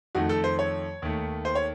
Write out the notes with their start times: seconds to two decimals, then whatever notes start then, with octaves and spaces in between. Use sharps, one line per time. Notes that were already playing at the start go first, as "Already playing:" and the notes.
0.15 F2 D#3 A3 F#4
0.29 A4
0.44 C5
0.59 C#5
1.02 D#2 D#3 A3
1.45 C5
1.55 C#5